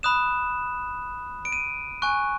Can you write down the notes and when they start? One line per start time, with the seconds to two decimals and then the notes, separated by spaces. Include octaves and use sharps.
0.03 B5 D#6 F#6 E7
1.45 D7
1.52 D#7
2.02 G#5 C#6 F#6